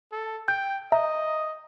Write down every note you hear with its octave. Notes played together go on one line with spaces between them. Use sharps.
A4
G5 G6
D#5 E5 A#5